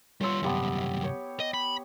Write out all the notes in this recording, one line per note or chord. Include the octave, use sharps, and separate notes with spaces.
G3 F4 C#5 C6 E6
C2 F#2 B3 G4 A5
C#5 G5
D#5
B5